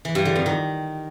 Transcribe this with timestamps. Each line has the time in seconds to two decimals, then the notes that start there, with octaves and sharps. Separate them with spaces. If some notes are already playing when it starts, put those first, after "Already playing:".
0.05 E3
0.15 G2
0.25 D3
0.36 F2
0.46 D#3